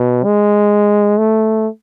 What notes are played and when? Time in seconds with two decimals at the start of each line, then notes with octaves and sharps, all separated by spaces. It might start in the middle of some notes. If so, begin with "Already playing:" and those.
Already playing: B2
0.24 G#3
1.18 A3